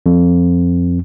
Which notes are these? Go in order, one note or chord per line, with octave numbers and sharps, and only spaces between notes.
F2